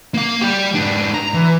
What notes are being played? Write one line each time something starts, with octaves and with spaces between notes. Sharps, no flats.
A#3 F5
G3 G4
G#2 D4
A#5
E3